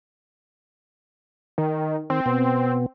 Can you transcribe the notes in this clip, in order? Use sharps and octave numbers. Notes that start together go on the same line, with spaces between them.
D#3
D#3 C4
B2 B3